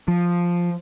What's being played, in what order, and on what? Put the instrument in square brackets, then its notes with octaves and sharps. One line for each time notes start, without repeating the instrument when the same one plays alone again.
[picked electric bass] F3